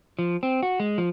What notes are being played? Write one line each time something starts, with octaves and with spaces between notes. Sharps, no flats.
F3
C4
F#4
G#3
F3